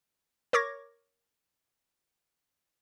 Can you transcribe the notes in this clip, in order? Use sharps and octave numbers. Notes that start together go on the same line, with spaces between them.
A#4 C#5 C#6 D6 G#6 A#6